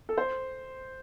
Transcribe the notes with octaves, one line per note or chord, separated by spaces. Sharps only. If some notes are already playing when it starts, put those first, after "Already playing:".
A4
C5